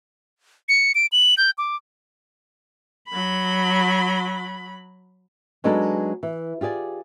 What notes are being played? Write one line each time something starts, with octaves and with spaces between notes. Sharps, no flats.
C#7
D7
F#7
G6
D6
F#3 B5
F#3 G#3 B3 D4 D#4 A4
E3
F4 G4 G#4 D5